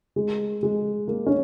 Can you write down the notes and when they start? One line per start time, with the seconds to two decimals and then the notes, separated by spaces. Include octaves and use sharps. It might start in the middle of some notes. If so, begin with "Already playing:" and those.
0.16 G#3
0.63 G#3
1.08 A#3
1.26 C#4